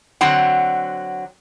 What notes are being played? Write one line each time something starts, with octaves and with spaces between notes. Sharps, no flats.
D3 F#3 C4 F#5